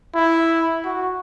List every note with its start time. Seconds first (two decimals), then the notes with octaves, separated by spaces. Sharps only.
0.15 E4
0.84 F#4